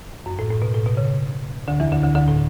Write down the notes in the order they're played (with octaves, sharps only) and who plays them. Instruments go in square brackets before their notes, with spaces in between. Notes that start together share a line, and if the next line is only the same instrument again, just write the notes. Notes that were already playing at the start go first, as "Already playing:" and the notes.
[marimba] F#2
A2
A2
B2
A2
B2
C#3
D2 D3
E2 E3
D2 D3
D2 D3
D2 D3
A2